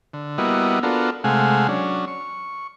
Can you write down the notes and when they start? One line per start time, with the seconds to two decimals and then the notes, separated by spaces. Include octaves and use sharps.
0.13 D3
0.38 G3 A#3 B3 E4 F#4 D#5
0.83 B3 D4 F4 F#4 A4 A#4
1.24 C3 G#3 A3 F5 F#5 G#5
1.68 F#3 C#4 D4
2.08 C#6